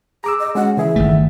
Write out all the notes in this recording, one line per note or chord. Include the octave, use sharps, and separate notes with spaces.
G#4 A#5 D6 E6
D#5
G#3 C#4 F#4 F#5
C#3 E3 G#4 E5
G1 D#3 A3